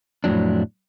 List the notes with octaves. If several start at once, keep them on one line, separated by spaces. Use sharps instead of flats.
F2 A2 C3 F#3 D4